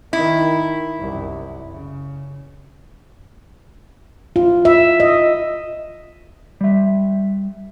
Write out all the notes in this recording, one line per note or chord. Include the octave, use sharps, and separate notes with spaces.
D#3 D#4 E4
C2 F#2
C#3
F4
E5
D#5
G3 E5